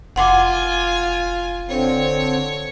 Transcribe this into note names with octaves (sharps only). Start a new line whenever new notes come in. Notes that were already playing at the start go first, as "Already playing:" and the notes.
F1 F4 F#5 G#5 C6 D6
D3 C4 C#5